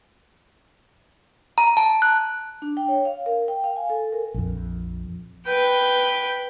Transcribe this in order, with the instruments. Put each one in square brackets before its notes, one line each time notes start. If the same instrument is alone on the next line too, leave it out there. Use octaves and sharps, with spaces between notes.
[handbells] A#5
A5
F#6
[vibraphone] D4
G5
C#5
F5
A#4
G5
F5
G#5
A4
A#4
[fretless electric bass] A#1 F2
[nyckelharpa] B4 G5